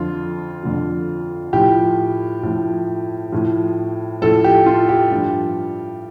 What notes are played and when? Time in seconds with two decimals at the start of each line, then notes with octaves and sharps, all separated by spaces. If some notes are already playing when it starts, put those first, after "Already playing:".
Already playing: F2 D3 F3 F4
0.63 F2 D3 F3
1.53 A2 F3 G4
2.43 A2 F3
3.32 A2 F3
4.22 A2 F3 A4
4.44 G4
4.66 F4
4.89 G4
5.11 G2 F3